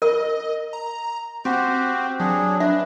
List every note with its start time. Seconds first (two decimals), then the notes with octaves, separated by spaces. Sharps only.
0.02 A#4 D#5
0.73 A#5
1.45 C4 F#4 G4 C5
2.19 F#3 D4 G#4
2.60 D4 B4 E5